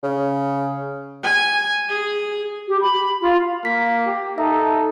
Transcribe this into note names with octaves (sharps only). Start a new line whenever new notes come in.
C#3
G#5
G#4
G4
B5
F4
A#3 B6
G4
D#4 A4 E5